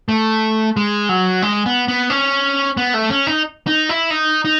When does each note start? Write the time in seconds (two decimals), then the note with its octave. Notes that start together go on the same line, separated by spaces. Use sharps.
0.09 A3
0.77 G#3
1.09 F#3
1.42 G#3
1.66 B3
1.88 B3
2.10 C#4
2.77 B3
2.94 A3
3.10 C#4
3.27 D#4
3.67 D#4
3.89 E4
4.10 D#4
4.45 D#4